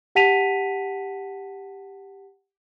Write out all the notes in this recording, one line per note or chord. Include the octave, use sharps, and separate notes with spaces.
G4 F#5 A5 B6 D#7 F7